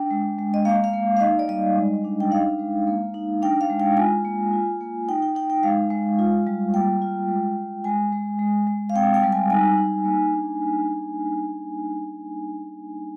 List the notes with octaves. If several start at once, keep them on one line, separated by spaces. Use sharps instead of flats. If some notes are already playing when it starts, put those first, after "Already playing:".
Already playing: D4 G5
G#3
G#3
D#5
A#3 F5
F5
A#3
F5
D#4 D#5
D5
G3 D#5
G#3
D4
G5
D#4 F5
G#3
A#3
D#4
D4 G5
F5
G#3
G5
F4 G#5
A#3
F4
A#3
D#4 G5
G5
D#4 G5
G5
G#3 F5
G#3
F4
G3
A#3 G5
F4
G#3
G#3
G#3 G#5
G#3
G#3
G#3
F5
C4 G5
G5
G3
G#5
D#4 G#5
D#4
A#3
D4